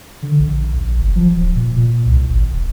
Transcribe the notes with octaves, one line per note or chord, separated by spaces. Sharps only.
D3
A#1
A#1
F#1
F3
D1
A#2
A#2
C2
G#1
E1